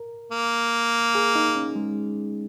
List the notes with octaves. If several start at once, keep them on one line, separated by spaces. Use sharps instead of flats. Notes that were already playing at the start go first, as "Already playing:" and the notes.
Already playing: A#4
A#3
G#4
D#4
C#4
G#3